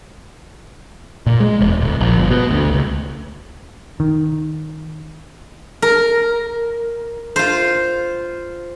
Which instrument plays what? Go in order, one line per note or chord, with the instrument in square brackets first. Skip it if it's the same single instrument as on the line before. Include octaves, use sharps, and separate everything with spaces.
[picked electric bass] A#2
G#3
E1
D1
A#1
G1
B2
D2
C#2
D#3
[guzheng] A#4
F4 C5